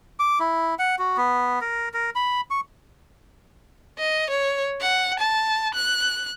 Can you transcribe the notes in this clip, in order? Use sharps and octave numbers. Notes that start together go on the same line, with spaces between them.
D6
E4
F#5
F#4
B3
A#4
A#4
B5
C#6
D#5
C#5
F#5
A5
F#6